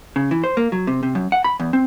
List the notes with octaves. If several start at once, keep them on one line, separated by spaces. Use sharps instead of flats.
C#3
E3
C5
A#3
F#3
C3
C3
F#2
F#5
B5
E2
C4